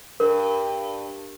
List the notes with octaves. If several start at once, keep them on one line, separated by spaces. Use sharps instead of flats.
G2 A#4